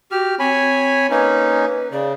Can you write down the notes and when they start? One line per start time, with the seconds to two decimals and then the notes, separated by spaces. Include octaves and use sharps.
0.11 F#4 G4 F6
0.39 C4 C#5 G#5 B5
1.10 A#3 C#4 D#4 B4
1.92 C#3 D5